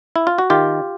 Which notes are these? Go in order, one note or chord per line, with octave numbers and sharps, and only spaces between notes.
E4
F4
F#4
D#3 F4 G4